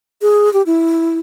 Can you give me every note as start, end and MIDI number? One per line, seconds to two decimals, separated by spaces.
0.22 0.52 68
0.53 0.62 67
0.66 1.19 64